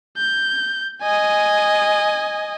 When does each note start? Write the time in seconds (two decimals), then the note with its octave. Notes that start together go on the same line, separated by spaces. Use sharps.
0.17 G6
1.02 D#5 G#5